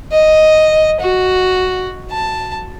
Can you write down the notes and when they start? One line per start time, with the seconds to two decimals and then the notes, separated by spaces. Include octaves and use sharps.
0.12 D#5
1.00 F#4
2.11 A5